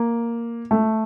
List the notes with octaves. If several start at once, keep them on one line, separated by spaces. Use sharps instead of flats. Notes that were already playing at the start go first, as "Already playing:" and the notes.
Already playing: A#3
A3